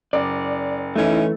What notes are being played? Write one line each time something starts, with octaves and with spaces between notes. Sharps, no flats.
F#1 D5
E3 A3 C#4 D#4 E4